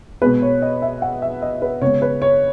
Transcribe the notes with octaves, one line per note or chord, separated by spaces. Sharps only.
B2 G#3 B3 B4
C#5
D#5
E5
F#5
E5
D#5
B4
C#3 G#3 B3 C#5
B4
C#5